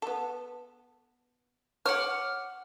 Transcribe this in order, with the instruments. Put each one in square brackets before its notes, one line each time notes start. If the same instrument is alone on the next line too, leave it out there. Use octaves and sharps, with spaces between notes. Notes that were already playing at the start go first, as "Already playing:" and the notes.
[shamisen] B3 A4
[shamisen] C#5 [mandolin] F#5 D6 F6